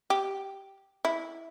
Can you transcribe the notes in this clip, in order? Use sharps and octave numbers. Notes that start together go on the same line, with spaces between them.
G4
E4